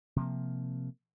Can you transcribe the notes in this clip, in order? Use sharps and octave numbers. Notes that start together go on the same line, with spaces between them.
C3 F3 A#3